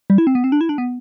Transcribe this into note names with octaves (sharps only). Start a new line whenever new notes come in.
G3
E4
C4
B3
C4
D4
E4
D4
B3